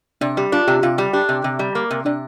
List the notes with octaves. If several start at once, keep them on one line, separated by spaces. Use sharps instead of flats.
C3 D4 D5
G3 G4
D4 F4
C3 G4
C3 F4 F5
G3 G4 G5
D4 G4 G5
C3
C3
G3
A#3
C3
C3 D4 D5